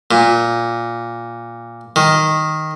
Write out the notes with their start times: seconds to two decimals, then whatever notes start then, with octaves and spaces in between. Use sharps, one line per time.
0.11 A#2
1.96 D#3